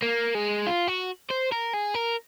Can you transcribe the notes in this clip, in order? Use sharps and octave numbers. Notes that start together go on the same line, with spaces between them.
A#3
G#3
F4
F#4
C5
A#4
G#4
A#4